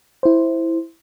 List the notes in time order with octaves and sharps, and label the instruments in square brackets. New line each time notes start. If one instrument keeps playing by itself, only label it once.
[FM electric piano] E4 C5